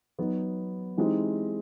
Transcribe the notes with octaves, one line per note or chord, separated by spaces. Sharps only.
F#3 B3 D#4
E3 G#3 C4 D#4 G4